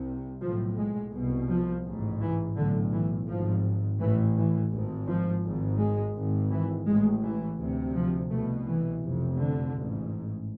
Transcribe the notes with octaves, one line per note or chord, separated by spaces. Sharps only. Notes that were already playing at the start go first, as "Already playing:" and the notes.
Already playing: C2 C3
B1 A2 F3
G#3
C2 B2
F3
A1 G#2
E3
B1 A2 D3
E3
G#1 G#2 F3
A1 A2 E3
E3
G#1 G#2
F3
G#1 G#2
G#3
G#1 G#2
E3
A1 A2 G#3
E3
D2 C3
F3
C2 B2 A3
E3
F1 F2 C3
D3
A1 G#2